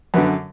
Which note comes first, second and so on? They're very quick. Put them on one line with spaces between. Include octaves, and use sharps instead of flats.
F#2 B3 D3